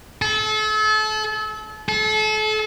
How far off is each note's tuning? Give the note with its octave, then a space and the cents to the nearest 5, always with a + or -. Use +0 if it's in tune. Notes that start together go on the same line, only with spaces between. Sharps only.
A4 -35
A4 -35